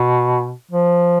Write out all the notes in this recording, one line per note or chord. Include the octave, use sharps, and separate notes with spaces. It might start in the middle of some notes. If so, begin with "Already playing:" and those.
Already playing: B2
F3